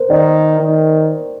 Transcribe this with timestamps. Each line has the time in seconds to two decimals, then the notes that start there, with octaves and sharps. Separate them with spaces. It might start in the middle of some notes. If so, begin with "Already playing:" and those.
Already playing: A#4 C5
0.10 D#3 D5
0.60 D#3